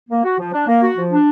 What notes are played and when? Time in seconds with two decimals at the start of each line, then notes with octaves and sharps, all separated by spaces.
0.10 A#3
0.24 F#4
0.38 F3
0.54 D4
0.67 A#3
0.83 F#4
0.96 F3
1.12 D4